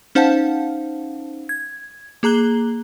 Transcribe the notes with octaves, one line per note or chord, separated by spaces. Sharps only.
C#4 D#4 C5 F5 F#5 A5
G#6
A#3 G#4 A#5 F#6 G7